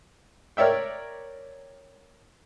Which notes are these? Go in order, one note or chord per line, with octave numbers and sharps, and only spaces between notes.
A#4 C#5 D5 E5 G5